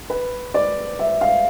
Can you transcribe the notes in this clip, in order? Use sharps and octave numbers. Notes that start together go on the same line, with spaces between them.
B4
D5
E5
F5